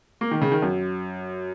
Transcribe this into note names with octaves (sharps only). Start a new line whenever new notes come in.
A#3
D#3
C#3
D#3
F#2